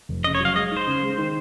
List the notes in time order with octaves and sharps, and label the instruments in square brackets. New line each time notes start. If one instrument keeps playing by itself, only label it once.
[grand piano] F1
[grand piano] C#3 [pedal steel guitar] D#5
[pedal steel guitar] C#5
[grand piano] F#3
[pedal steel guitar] F5
[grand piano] G#3 [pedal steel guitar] D#5
[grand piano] D#4
[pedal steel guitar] C5
[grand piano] C#3
G#3
D#3